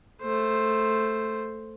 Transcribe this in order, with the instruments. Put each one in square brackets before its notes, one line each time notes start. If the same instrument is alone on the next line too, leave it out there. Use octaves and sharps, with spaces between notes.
[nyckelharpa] A3 C5